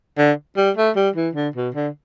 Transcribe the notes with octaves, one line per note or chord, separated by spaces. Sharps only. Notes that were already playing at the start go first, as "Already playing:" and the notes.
D3
G3
A3
G3
E3
D3
B2
D3